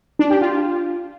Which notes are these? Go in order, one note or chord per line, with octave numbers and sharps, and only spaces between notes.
D4
G4
F4